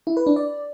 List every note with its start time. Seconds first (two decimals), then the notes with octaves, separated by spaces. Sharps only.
0.07 E4
0.17 B4
0.27 D4
0.36 D5